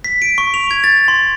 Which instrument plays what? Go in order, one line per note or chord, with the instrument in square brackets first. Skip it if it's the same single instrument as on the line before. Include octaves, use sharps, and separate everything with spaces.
[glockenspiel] B6
D7
C#6
F7
G#6
A6
C6